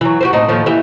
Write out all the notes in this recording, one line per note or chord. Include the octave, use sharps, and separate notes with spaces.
E3 F#3
F#4 G4 C5
A2 C4 D#4
D#2 A2 F3
E3 G4 E5